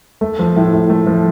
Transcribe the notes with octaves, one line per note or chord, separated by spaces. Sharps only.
A3
F3
A2
A2
A3
F3